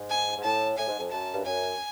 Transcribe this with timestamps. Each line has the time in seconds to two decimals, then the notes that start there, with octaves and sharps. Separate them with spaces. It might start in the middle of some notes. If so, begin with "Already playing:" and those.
Already playing: G#2
0.10 G#5
0.37 G#2
0.43 A2 A5
0.77 A2 G#5
0.88 G#2
1.00 F2
1.11 F#2 A5
1.33 G2
1.44 F#2 G#5